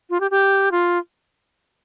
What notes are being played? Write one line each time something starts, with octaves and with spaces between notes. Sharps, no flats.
F4
G4
G4
F4